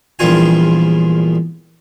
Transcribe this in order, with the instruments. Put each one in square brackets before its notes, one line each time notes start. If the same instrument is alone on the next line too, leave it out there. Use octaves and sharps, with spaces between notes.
[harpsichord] A#1 E2 G3 F4 G#5